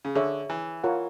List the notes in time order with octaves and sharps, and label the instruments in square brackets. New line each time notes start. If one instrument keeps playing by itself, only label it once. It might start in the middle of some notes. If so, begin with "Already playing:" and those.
[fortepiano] C#3
[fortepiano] D3 [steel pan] G#4 C#5 E5
[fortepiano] E3
[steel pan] F4 A#4 C#5 F#5